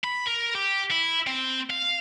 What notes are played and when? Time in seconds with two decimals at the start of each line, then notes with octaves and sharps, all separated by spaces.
0.04 B5
0.27 A#4
0.55 G4
0.91 E4
1.27 C4
1.70 F5